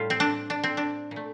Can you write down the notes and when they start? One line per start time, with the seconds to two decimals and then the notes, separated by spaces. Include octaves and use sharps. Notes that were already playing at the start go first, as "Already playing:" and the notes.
Already playing: A2 G3 F4
0.10 C4
0.20 D4
0.50 D4
0.64 C4
0.77 D4
1.11 A#2
1.16 A3